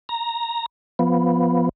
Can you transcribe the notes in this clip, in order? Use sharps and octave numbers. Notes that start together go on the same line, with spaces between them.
A#5
F3 B3